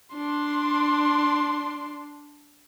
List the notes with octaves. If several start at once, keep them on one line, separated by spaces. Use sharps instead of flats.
D4 C6